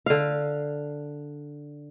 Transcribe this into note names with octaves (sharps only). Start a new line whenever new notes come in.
D3 F5